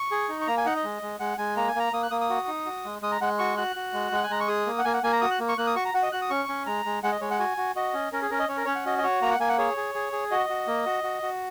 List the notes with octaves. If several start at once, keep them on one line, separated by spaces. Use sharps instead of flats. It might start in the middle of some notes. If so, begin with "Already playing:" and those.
Already playing: C#6
G#4
D#4
C#6
A#3 A#5
G#5
D#4 F#5
D#5
G#3
G#3
G#3 F#5
G#3 G#5
A#3 A#5
G#5
A#3 A#5
A#3 D#6
F#6
A#3 D#6
D#6
F#4
D#4
F#4
G#3
G#3 D#6
A#5
G#3 F#5
F#4 C#6
F#4 F#6
F#4
G#3
G#3 F#5
G#5
G#3 A#5
C#6
G#4 D#6
A#3
F#5
A#3 G#5
F#5
A#3 G#5
A#5
F#4 D#6
F#6
A#3
C#6
A#3 F#6
D#6
F#4 C#6
A#5
F#4 F#5
D#5
F#4 F#6
D#6
C#4 C#6
C#4
G#3 A#5
G#3
G#3 F#5
D#5
G#3 C#5
F#5
F#4 G#5
F#4
F#4 D#5
C#4
C#4 A#4
G#4
C#4 A#4
D#5
C#4 C#5
A#4
C#4 C#5
F#5
F#4 D#5
D#5
F#4 C#5
A#3 A#5
F#5
A#3 G#5
F#5
G#4 C#5
G#4
G#4
G#4
F#4 D#5
F#4
A#3
F#4
F#4
F#4